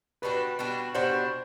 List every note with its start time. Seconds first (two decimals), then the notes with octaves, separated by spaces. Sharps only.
0.22 B2 G3 D4 F#4 B4
0.59 B2 G3 D4 F#4
0.94 B2 G3 D4 F#4 C5